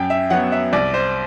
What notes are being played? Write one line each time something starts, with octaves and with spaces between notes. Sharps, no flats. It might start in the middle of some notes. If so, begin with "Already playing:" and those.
Already playing: F#2 G5
E5
F#3 B3 F#5
E5
C2 D5
C5